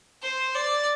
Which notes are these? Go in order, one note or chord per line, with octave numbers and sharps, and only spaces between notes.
C5
D5